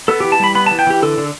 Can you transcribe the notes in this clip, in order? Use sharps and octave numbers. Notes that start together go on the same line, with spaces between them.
B3 A4
E3 G4
A5
G3 B5
B3 B5
E3 A5
G5
E3 G4
D3 A4
D3